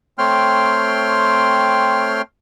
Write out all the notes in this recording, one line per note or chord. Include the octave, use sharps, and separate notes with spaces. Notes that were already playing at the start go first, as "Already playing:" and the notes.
A3 C4 C#5 G5 C6 F6